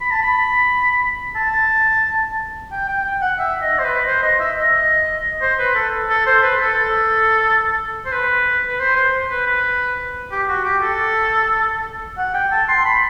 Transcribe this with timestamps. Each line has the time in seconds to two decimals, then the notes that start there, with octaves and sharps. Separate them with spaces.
0.01 B5
0.11 A5
0.22 B5
1.35 A5
2.71 G5
2.88 G5
3.04 G5
3.21 F#5
3.39 E5
3.62 D#5
3.79 C5
3.84 B4
4.07 C5
4.23 D#5
4.40 E5
4.57 D#5
5.41 C5
5.59 B4
5.75 A4
6.09 A4
6.26 C5
6.43 B4
6.60 A4
8.06 C5
8.12 B4
8.68 B4
8.79 C5
8.96 C5
9.30 B4
9.46 B4
10.31 G4
10.49 F#4
10.65 G4
10.82 A4
12.18 F#5
12.34 G5
12.51 A5
12.69 C6
12.85 B5